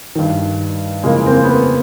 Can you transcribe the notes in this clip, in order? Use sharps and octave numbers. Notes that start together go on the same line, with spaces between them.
G2 D#3
F2 C#3 E3 G#3 A#3
A#3 C4
B3
A#3 C4